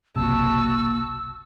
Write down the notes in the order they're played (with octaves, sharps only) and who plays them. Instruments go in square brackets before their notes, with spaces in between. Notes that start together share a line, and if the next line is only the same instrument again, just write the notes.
[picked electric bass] F#1 B1 C3 [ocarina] A#3 [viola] F#4 A5 [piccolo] E6